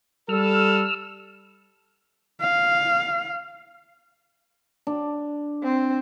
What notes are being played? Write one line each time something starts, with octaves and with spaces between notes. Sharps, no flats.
G3 A4 E6 F6
F5
D4
C4